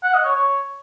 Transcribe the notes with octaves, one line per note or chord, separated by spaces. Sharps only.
F#5
D#5
C#5
C#5